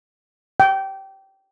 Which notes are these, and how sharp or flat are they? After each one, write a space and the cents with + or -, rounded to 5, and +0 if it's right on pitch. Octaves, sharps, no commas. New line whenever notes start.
G5 -20